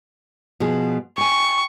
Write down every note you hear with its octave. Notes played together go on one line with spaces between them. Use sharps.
B2 F3 G#4
G5 G#5 C#6